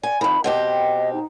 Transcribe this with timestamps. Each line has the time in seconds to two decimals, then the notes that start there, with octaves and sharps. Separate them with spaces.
0.03 D5 G#5
0.21 F2 D#3 B5
0.44 B2 C4 G4 D#5
1.13 D#4